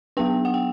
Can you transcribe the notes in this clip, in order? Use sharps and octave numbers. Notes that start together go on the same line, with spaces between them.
F#3 B3 D4 G5
F#5
G5